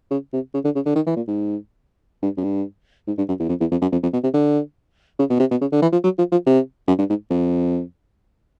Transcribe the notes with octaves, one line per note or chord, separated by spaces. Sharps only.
C#3
C3
C#3
D3
C#3
D3
D#3
E3
A#2
G#2
G2
F#2
G2
G#2
G2
F#2
E2
F2
E2
F2
F#2
F2
F2
B2
C3
D3
C#3
B2
C3
B2
C#3
D3
E3
F3
F#3
F3
F3
C3
F#2
G2
G#2
F2